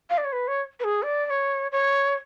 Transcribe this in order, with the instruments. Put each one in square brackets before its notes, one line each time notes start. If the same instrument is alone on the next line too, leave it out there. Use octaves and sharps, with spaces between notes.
[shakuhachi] F5
D5
C#5
B4
C#5
B4
G#4
D5
D5
C#5
C#5